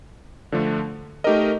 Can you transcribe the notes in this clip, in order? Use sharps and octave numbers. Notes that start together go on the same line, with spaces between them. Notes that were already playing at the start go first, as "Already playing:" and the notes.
D3 F3 A3 D4
A3 D#4 G4 A#4 D#5